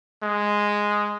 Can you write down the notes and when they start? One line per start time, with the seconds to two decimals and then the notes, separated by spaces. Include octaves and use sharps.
0.23 G#3